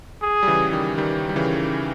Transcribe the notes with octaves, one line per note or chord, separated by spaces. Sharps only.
G#4
G3
C#3 E3
D#3 G3
D#3 G3
G3
C#3 E3